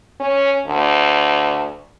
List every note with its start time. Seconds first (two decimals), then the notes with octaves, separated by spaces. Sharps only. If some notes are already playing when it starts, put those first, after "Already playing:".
0.20 C#4
0.67 D2